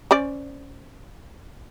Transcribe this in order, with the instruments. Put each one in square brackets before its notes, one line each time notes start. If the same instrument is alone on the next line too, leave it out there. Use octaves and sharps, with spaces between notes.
[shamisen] C#4 C5 D5